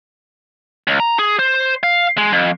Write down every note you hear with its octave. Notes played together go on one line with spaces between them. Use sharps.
C#2
A#5
G#4
C5
F5
G#3
F2